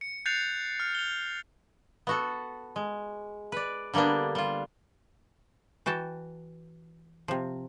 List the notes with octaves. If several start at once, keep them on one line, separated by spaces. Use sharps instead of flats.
C#7
F#6 G6 A6 C7 C#7 F7
F6
F7 G7
B3 F#4 A4
G#3
B4 D5
D3 G3 A#3 B3 D4
G3 F4
E3 F#4 G5 A5
C3 F3